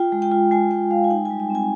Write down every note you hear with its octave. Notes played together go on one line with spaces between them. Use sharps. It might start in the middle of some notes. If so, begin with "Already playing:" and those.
Already playing: F4 G5
G#3
G5
F4
G#3 G#5
G#3 G5
G#3 F5
G#5
D#4 G5
G3 G#5
G5
C4
G#5